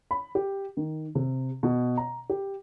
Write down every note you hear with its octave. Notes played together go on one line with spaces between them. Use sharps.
B5
G4
D#3
C3
B2
A#5
G4